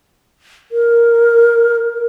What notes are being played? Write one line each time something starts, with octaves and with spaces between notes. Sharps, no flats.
A#4